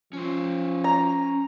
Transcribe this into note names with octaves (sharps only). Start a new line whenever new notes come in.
F3 C#4 C5
A#5